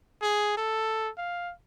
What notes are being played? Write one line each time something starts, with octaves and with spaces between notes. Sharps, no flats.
G#4
A4
F5